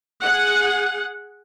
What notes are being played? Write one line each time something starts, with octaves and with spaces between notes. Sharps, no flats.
G#4 F#5